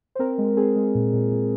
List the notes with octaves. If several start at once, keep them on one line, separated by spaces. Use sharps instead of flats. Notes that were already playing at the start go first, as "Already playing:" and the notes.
C5
C4 A#4
G#3
C4 G#4
G#3
A#2
A#2
A#2